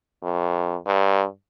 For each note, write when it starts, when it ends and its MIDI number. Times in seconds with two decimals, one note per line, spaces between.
0.23 0.76 41
0.86 1.25 43